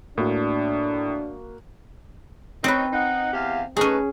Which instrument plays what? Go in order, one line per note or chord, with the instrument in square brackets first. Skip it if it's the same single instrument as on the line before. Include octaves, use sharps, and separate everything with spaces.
[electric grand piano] A2 [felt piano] A#3 F#4 [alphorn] D4
[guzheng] C4 B4 [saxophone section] D#4 C#5
[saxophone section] D#4 F#5
E2 G4 F5
[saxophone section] A3 D#4 B4 [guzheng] C#4 G#4